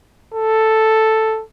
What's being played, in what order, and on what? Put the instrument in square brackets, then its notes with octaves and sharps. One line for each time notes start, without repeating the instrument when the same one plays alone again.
[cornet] A4